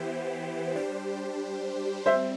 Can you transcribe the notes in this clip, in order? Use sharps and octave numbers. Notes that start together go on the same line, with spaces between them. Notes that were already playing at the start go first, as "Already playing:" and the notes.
Already playing: E3 B3 E4 G4 C5
G3 D4 G4 C5
G3 C4 C5 E5